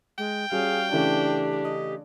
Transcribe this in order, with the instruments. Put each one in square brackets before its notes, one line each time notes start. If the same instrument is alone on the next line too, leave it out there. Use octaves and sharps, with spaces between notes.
[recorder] G#3 [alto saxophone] G5
[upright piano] G3 C#4 F#4 [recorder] G#4 [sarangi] F5
[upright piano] C#3 E3 A3 [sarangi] D4 [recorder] G4
[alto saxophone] D#5